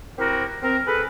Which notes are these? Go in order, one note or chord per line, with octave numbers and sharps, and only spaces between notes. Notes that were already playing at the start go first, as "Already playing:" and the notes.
C4 E4 F#4 G4 A#4
C4 A#4
G#4 A4 B4